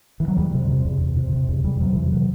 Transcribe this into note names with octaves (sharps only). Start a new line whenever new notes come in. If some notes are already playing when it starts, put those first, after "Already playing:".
E3
F#3
E2 G3
C3
C3
E2
E2
C3
C3
E2
E2 G3
C3 F#3
C3 E3
F#3